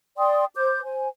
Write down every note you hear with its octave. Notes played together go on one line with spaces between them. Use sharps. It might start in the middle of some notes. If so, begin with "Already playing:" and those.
D5 G5 C6 D#6
C5 D6 G6
C5 G#5